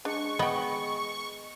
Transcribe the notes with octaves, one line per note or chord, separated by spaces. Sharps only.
G#3 D4 C#6
B3 D#5 G5